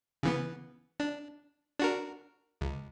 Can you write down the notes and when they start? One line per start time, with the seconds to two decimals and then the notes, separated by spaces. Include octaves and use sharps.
0.23 C#3 E3 B3
1.00 D4
1.79 D4 F#4 A#4
2.61 C#2